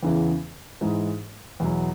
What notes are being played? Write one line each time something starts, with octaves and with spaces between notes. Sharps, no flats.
E2 C#3 E3
G#2 E3 G#3
E2 B2 F#3